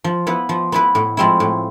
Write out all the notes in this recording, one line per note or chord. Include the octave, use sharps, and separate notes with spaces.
F3
B3 E4 B4
F3
B3 E4 B4
A2
F3 G#3 C4 E4
A2